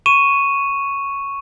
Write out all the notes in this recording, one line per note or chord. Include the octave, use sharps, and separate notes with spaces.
C#6 D#7 E7